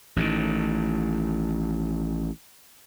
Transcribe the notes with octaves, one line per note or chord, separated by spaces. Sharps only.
A1 A2 C3 D#3